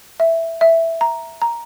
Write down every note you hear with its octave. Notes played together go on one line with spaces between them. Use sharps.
E5
E5
A#5
A#5